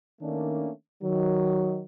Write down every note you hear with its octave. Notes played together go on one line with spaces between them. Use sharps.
D#3 A3 A#3 C#4 D4
D#3 F#3